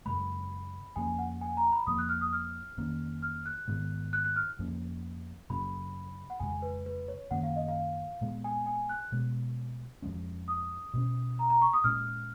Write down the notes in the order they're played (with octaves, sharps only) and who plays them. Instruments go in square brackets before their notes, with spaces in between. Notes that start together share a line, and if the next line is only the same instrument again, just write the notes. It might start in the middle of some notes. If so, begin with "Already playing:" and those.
[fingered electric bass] F#2 C#3 G#3 [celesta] B5
[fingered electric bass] F2 F3 A#3 C#4 [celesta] G#5
[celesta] F#5
G#5
A#5
B5
[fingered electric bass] F2 F3 A#3 [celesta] D#6
[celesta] F#6
F6
D#6
F6
[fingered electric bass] F2 D#3 A#3 C#4
[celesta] F6
F#6
[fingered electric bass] G#2 D#3 G#3 B3
[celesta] F#6
F#6
F6
[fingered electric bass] F2 F3 A#3 C#4
[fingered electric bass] F#2 C#3 F#3 C#4 [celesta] B5
[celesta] F#5
[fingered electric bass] F2 C#3 G#3 [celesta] G#5
[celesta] B4
B4
C#5
[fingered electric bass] F#2 D#3 A#3 C#4 [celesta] F#5
[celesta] F5
D#5
F5
[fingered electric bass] A#2 G#3 B3
[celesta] G#5
G#5
F#6
[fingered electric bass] B2 G#3 B3
F2 F3 G#3 C#4
[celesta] D#6
[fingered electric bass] B2 G#3 C#4
[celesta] A#5
A#5
C#6
D#6
[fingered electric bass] A#2 G#3 C#4 [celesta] F6